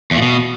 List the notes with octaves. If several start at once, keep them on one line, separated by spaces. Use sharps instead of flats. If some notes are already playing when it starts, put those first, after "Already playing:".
E2
A#2
B2